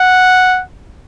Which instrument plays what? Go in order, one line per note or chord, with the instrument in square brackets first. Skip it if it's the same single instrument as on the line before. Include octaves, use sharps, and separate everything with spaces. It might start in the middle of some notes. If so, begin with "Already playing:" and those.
Already playing: [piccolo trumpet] F#5